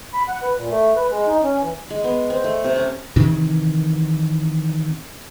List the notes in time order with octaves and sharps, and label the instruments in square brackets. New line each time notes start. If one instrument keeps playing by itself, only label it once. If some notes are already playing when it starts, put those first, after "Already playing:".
[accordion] B5
F#5
B4
A#2
A3
B4
G#3
D#4
C#4
E3
[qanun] G#3
B3
C4
A3
C3
C#4
[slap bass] C3 D#3 E3